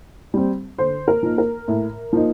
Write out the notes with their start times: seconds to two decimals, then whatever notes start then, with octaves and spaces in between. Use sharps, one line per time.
0.34 G3 C4
0.78 D3 C5
1.08 A#4
1.23 F3 A#3 D#4
1.38 A#4
1.68 A2
2.13 F3 A#3 D#4